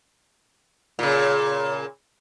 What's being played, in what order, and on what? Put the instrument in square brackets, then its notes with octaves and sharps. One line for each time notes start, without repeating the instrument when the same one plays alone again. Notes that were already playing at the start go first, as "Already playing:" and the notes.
[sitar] A#2 C#3